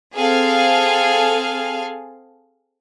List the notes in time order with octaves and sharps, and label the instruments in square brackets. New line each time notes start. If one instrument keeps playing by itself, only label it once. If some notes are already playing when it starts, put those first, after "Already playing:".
[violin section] C4 G#4 A4 F5